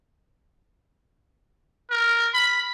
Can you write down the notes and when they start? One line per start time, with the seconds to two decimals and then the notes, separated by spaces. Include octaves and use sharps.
1.91 A#4
2.34 B5